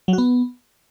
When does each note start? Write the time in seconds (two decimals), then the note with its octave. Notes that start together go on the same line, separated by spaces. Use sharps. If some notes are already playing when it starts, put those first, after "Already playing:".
0.08 F#3
0.13 F#4
0.18 B3